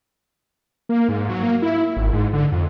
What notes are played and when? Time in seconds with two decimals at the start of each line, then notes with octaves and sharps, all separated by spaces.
0.89 A#3
1.09 G#2
1.29 F#3
1.43 A#3
1.62 E4
1.96 G#1
2.13 G#2
2.33 D3
2.52 F2